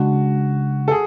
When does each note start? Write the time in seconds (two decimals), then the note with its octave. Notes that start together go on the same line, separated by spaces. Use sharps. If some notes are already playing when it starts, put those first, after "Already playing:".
Already playing: C#3 G#3 D4 F#4
0.88 A4
0.91 G#4